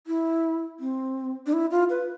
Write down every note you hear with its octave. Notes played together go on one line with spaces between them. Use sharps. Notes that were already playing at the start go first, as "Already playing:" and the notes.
E4
C4
D4
E4
F4
B4